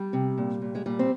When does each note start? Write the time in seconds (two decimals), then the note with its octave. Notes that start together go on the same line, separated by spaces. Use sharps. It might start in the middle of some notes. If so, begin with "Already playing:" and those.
Already playing: G3
0.13 C3
0.38 A#2
0.62 A#2
0.75 G#3
0.86 A#2 G3
0.99 C4